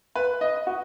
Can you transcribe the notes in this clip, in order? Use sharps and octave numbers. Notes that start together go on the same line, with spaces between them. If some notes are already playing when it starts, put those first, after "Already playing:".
B4
D#5
F#4